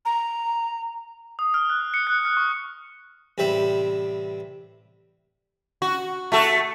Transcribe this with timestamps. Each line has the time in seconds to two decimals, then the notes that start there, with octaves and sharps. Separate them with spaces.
0.05 A#5
1.39 D#6
1.54 F6
1.70 F#6
1.94 C#7
2.07 F#6
2.25 F6
2.37 C#6
3.38 A1 C3 G3 G4 E5 B5
5.82 F#4
6.32 A3 F#4 A4